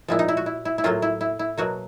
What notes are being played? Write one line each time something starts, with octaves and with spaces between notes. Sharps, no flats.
A#2 F3 G#3 E4
D#4
E4
F#4
E4
E4
E4
A2 F#3 A#3 C#4 F4
E4
E4
E4
B2 F#3 A#3 F#4